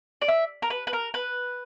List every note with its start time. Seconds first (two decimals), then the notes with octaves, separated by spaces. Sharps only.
0.22 D5
0.28 E5
0.62 A#4
0.70 B4
0.87 B4
0.93 A#4
1.14 B4